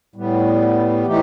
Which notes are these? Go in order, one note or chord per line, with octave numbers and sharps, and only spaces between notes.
A2 G3 B3
A2 E3 A3 D#4 G4